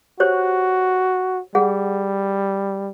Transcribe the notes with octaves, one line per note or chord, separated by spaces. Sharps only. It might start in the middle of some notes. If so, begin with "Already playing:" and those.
F#4 G4 C5 C#5
G3 G#4 F#5